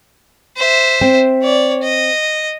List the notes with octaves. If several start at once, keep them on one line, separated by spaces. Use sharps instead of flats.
C5 E5
C4
C#5 D5
D#5